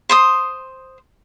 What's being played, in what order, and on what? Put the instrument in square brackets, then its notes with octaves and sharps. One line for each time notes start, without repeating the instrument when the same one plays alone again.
[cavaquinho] C5 C6 D#6